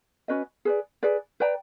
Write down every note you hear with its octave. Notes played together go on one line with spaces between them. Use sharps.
C#4 F#4 B4 D#5
G#4 B4 D5
G#4 B4 D5
B4 D5 G5 A#5